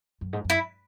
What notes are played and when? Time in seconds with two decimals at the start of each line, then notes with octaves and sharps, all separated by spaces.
0.21 F#2
0.33 G#2
0.45 F#2
0.50 E4